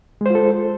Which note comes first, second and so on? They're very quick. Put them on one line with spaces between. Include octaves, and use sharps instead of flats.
G#3 C5 F4 A4